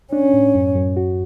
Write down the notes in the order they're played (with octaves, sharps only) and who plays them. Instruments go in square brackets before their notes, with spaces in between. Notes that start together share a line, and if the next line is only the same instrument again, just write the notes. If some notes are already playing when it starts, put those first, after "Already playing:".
[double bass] C#4 [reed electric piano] D4
[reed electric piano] A2
F#2
F#2
F#4